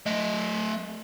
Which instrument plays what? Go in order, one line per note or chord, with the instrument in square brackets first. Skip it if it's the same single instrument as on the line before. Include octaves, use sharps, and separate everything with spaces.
[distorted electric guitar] A3 D#5